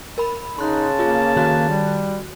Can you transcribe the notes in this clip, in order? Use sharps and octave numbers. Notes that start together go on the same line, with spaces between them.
A#4 B5
C#3 D#4 A5 C6 F#6
A#3 F4 G#4
D#3 F#4 F#6
G3